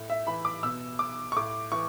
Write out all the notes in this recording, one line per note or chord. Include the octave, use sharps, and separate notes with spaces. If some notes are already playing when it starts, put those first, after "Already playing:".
Already playing: A2
E5
E3 B5
D6
B2 E6
D6
C#6
A2 D6
E3 C#6